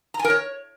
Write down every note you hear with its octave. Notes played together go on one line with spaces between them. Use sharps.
A#5
G#5
A#4
C#5